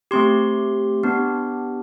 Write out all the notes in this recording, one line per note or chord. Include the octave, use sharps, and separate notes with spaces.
A3 C4 G4 C6
B3 D4 G4